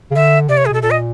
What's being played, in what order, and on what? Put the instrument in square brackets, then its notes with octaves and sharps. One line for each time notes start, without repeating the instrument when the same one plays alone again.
[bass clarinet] C#3
[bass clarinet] D3 [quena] E5
[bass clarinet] C3 [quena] D5
[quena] C#5
G#4
[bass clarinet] B2 [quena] A4
[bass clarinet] A#2 [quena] A4
[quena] D#5